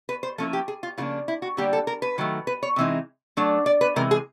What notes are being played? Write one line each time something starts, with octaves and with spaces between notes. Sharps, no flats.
B4
C5
F3 A#3 C#4 E4 A4
G4
G#4
F4
C#3 F3 A#3 D4 F4
E4
F#4
D3 G3 A#3 D4 G4
A4
A#4
B4
D#3 F#3 A3
B4
C#5
C3 E3 G#3 C4 D#4
F#3 A3 D4
D5
B4
C3 E3 G#3 A#4
G#4